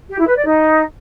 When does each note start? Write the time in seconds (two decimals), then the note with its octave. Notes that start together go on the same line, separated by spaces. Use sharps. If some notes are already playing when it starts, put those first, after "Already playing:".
0.09 G4
0.18 E4
0.27 B4
0.36 D5
0.45 D#4